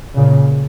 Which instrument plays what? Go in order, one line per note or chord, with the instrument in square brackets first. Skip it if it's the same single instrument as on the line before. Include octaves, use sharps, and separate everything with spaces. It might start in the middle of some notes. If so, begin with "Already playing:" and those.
[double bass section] A#2 C#3